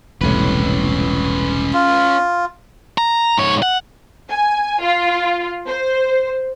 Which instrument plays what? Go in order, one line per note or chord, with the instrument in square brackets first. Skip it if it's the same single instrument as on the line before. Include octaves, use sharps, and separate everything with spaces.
[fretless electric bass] E1 C2 A2 [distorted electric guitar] C#4 B4
[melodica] F4
[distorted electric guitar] A#5
G#2 C#5
F#5
[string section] G#5
F4
C5